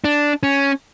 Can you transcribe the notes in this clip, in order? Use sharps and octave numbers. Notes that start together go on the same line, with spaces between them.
D4
C#4